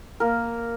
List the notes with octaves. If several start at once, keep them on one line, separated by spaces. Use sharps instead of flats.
A#3 A#4